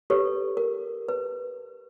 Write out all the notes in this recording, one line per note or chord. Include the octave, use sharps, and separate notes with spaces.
G4 A4 B4 C#5
A#4
B4